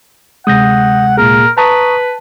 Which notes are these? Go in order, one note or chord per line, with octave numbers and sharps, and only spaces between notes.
D2 C3 G#3 F#5 D#6 G6 A#6
A#2 A#3 G#4 A#4
B4 A5 A#5 C#6 D#6